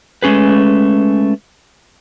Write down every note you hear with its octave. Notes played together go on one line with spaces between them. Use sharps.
G#3 A3 C#4 G#4 B4